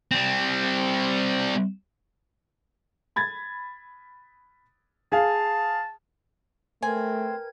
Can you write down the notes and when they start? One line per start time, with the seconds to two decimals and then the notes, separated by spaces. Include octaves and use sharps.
0.11 G3 C4
3.16 B5 G#6 A6
5.12 G#4 F5 A5
6.82 A3 C4 A#4 B4 G#5 G#6